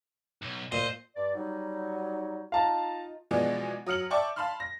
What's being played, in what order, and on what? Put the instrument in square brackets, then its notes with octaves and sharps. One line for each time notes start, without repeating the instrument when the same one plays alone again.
[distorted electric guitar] B1
[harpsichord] A#2 [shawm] C5 [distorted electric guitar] D#5
[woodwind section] G2 D5
F#3 G3 D#4
[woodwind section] D#4 F4 [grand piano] F5 A5 A#5
[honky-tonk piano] B2 E3 F3 G#3 B3 D4
F#3 D#6 F6 C#7 F#7
D5 E5 G5 A5 C#6 D6
F5 A5 B5 C6 F6
A#6